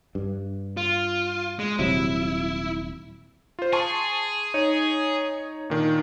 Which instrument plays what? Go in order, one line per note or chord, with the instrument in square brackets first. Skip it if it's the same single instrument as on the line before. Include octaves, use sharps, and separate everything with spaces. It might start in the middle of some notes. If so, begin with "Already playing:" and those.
[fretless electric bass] G2
[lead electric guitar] F4
G#3
[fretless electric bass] D#1 C3 F#3 [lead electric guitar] E4
[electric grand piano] F4 C5
[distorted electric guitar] G#4 [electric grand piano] A5 C6 C#6
[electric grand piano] D#4 C#5
A#2 D#3 D4